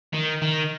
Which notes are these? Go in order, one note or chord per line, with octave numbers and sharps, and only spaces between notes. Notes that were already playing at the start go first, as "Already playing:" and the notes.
D#3
D#3